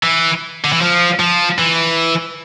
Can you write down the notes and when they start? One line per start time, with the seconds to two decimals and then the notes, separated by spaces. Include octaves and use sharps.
0.03 E3
0.64 D3
0.73 E3
0.81 F3
1.20 F3
1.58 E3